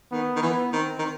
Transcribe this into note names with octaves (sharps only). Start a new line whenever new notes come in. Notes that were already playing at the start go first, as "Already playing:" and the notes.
D#3 B3
D#3
E3 B3
D#3 C4
D#3